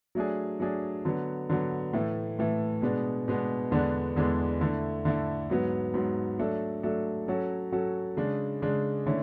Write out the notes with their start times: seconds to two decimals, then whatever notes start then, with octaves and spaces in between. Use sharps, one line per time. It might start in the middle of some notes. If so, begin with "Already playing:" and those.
0.15 F#3 A3 D4 G#4
0.60 F#3 A3 D4 G#4
1.05 D3 F#3 B3
1.50 D3 F#3 B3
1.93 A2 E3 A3
2.39 A2 E3 A3
2.82 B2 G#3 B3 D4
3.28 B2 G#3 B3 D4
3.71 E2 D3 G#3 B3 D4
4.16 E2 D3 G#3 B3 D4
4.61 D3 A3 E4
5.05 D3 A3 E4
5.50 G#2 F#3 B3
5.94 G#2 F#3 B3
6.39 F#3 A3 D4 A4
6.83 F#3 A3 D4 A4
7.28 F#3 C#4 F#4 A4
7.72 F#3 C#4 F#4 A4
8.17 C#3 G#3 D4
8.62 C#3 G#3 D4
9.06 D3 A3 C#4 E4